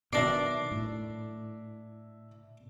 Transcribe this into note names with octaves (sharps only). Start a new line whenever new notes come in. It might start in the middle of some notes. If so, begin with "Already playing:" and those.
B2 D#3 F#3 D4 D5 E5 A#6 C7
A2